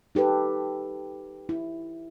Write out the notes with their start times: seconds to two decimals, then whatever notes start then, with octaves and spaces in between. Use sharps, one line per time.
0.15 D#4 G4 A4 B4
1.49 E4